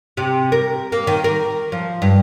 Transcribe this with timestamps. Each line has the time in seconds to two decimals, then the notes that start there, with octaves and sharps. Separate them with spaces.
0.17 C3
0.52 A#4
0.92 A#3
1.07 D#3
1.24 A#4
1.72 F3
2.02 G2